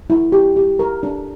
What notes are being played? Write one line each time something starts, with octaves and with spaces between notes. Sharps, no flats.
E4
G4
G4
A#4
D4